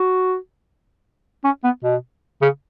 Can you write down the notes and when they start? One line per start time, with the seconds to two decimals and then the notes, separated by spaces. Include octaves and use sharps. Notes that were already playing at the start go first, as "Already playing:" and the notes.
Already playing: F#4
1.44 C#4
1.64 B3
1.84 B2
2.42 C#3